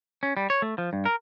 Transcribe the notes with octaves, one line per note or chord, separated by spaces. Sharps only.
C#4
G3
C#5
A3
F3
G2
A#4